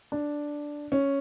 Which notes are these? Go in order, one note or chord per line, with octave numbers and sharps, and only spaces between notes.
D4
C#4